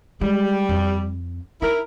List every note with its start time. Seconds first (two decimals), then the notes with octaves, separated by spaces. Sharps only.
0.21 G3 G#3
0.69 F2
1.62 D#4 E4 A#4